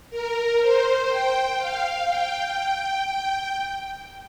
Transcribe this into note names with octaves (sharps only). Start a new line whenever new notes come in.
A#4
C5
G5
F5
G5
G5